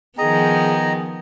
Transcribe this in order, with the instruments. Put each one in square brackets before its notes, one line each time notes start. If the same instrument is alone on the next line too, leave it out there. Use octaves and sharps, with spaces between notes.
[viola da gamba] D#3 F3 B3 [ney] G#4 [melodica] D#5 A#5 [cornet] G5